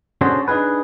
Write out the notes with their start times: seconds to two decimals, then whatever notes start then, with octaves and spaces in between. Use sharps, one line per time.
0.21 C#4 D4 F#4 G#4 A4 C5
0.48 D4 D#4 F4 G#4 B4